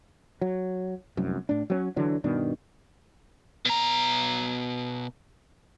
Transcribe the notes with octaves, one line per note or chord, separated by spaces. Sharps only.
F#3
F1 C2 F#2
A2 D4
F#3 C4 C#4
D3 E3 F#3 D4
G2 B2 D#3 D4
B2 A#5